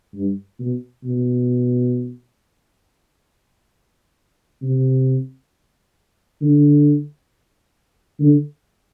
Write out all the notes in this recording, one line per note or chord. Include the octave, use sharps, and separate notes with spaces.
G2
B2
B2
C3
D3
D3